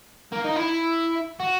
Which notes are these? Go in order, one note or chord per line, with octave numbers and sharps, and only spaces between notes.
A#3
D#4
E4
F#4